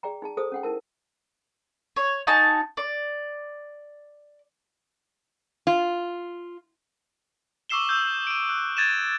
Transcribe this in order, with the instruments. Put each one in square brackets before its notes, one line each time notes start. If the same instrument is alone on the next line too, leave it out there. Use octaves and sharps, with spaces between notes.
[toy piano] G#4 D5 G5 A#5
D#4 G#4 A5
G#4 A4 C5 D#6
C#4 F#5 G5
D#4 E4 A#4 A5
[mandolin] C#5
D#4 F#4 G#5 A5
D5
[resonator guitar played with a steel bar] F4
[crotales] C#6 D6 E6 C7 E7 G7
D#6 E6 G6
D7 D#7
F#6
G#6 A6 D#7 E7